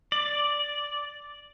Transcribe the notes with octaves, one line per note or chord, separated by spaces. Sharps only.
D5